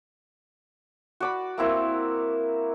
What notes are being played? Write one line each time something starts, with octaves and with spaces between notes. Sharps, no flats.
F#4 D5 B5
A#3 C4 E4 A#4